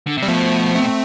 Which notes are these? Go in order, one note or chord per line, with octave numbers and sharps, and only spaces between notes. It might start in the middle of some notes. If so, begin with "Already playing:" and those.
D3
C3 G3
B2 F3 A3
A3 C4